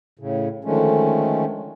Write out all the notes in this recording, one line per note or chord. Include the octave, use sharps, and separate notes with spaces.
A2 C#3
D3 D#3 F3 G#3 A3 C#4